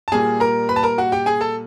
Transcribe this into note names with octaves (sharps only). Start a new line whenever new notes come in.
A5
A#2 G3 A#3 G#4 G#5
A#4 A#5
B4 B5
A5
A#4 A#5
F#4 F#5
G4 G5
G#4 G#5
A4 A5